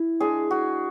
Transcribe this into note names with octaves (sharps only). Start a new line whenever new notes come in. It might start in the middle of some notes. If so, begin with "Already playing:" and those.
Already playing: E4
G#3 D4 G#4
F#4